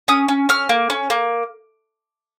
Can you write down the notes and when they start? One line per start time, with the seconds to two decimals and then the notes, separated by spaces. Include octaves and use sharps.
0.08 C#4 D#6
0.28 C#4
0.49 C#4 F6
0.69 A#3
0.90 C#4
1.10 A#3